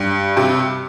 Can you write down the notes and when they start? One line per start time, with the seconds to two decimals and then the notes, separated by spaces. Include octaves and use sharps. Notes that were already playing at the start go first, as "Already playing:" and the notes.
Already playing: G2
0.37 G2 C3